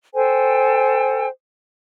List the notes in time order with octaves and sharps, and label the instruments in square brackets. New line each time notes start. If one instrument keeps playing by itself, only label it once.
[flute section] A4 C5 G5 G#5